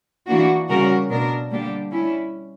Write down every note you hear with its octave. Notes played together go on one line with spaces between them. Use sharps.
E3 A#3 D4 F#4
C#3 G3 C#4 F#4 A#4
B2 A#3 D4 A#4
D3 G3 A#3 D4 G4
G3 C#4 E4